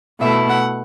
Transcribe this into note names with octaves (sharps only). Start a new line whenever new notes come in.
B2 A3 E4 E5
F#5